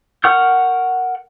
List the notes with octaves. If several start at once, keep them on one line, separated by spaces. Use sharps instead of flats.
A#4 F#5 C#6 F6 G6